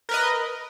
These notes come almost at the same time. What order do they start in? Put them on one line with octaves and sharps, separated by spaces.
A#4 B4 D#5